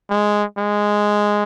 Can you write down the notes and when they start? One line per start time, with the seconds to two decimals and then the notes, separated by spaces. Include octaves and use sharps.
0.10 G#3
0.58 G#3